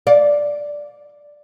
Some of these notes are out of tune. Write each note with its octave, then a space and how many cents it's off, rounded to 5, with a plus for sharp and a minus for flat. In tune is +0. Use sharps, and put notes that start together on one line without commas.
D5 +0 F5 +25